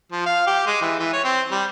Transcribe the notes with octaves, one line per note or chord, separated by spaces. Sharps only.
F3
F5
G4
G#3
E3
E3
C#5
C4
G3